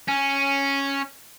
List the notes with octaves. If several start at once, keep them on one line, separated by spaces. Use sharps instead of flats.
C#4